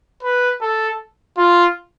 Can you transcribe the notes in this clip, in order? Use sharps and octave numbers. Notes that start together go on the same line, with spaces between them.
B4
A4
F4